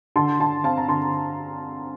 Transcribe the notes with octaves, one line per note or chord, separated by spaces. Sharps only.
D3 A5 C6
D3 A5 C6
C4 F5 A5
A#5
D3 A5 C6